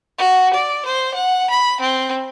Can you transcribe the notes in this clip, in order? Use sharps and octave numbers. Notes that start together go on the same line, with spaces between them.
F#4
D5
C5
F#5
B5
C4